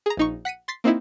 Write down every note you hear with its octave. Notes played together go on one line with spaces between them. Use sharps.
G#4 A#5
A#1 D#4 C#6
F#5 B6 C#7 D#7
C6 A6 B6 C7
A#3 C4 D#4 E4